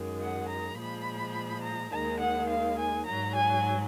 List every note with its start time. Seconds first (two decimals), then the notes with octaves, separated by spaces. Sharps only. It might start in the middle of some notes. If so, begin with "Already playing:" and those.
Already playing: F#2 D#3 G#3
0.20 F#5
0.48 A#5
0.77 A#2 F3 G#3 B5
1.63 A#5
1.92 D#2 D#3 G#3 A#5
2.20 F#5
2.49 F5
2.78 G#5
3.06 G#2 F#3 A#5
3.35 G#5